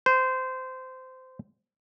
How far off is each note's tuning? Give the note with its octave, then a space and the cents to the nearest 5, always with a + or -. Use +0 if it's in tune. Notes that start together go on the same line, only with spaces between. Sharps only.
C5 -20